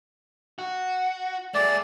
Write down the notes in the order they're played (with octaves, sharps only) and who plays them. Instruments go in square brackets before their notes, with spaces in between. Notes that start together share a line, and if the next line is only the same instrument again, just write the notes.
[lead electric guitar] F#4
[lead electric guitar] A3 G#4 [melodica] D5